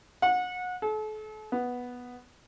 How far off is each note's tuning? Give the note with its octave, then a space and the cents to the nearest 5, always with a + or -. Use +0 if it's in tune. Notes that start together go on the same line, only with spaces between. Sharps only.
F#5 -30
A4 -40
B3 -5